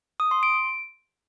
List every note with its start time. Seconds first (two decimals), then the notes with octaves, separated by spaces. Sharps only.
0.20 D#6
0.31 C6
0.43 D7